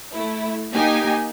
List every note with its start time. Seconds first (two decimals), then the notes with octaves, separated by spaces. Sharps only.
0.14 A3 E4
0.73 A#3 D#4 G4 G#5